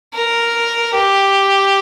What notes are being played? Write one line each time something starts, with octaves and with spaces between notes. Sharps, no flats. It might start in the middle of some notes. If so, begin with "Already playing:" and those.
A#4
G4